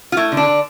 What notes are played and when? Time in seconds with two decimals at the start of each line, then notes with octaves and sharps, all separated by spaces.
0.12 F4
0.17 A3 E4
0.32 D3
0.37 D4
0.48 D3